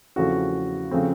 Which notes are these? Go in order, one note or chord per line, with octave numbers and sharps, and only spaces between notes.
E2 C#3 F3 A3 C4 F#4
C#3 F3 A3 C4